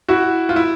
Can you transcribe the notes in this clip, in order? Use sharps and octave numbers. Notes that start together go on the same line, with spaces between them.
E4 F#4
F4
E4